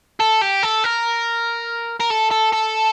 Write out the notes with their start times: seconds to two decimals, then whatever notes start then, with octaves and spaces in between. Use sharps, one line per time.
0.20 A4
0.41 G4
0.63 A4
0.84 A#4
2.00 A#4
2.10 A4
2.31 A4
2.52 A4